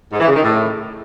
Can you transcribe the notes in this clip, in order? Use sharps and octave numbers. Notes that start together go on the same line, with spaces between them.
G#2
E3
C#3
D#3
A2